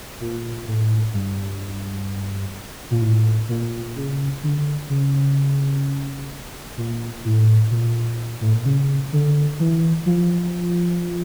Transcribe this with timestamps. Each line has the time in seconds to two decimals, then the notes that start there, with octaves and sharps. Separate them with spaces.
0.20 A#2
0.68 A2
1.14 G2
2.91 A#2
3.02 A2
3.49 A#2
3.96 C#3
4.44 D3
4.89 C#3
6.77 A#2
7.25 A2
7.71 A#2
8.41 A2
8.53 A#2
8.66 C#3
9.13 D3
9.60 E3
10.06 F3